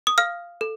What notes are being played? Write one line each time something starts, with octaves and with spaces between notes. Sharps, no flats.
D#6
F5 F6
A4